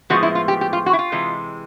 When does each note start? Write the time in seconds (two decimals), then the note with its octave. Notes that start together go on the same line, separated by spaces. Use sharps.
0.10 A2 F3 G#3 B3 F#4
0.23 E4
0.35 F4
0.48 G4
0.61 G4
0.73 F4
0.86 F#4
0.93 E4
0.99 F4
1.12 C3 E3 G#3